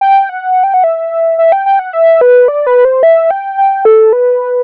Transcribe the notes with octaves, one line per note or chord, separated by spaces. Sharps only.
G5
F#5
G5
F#5
E5
E5
G5
G5
F#5
E5
B4
D5
B4
C5
E5
G5
G5
A4
B4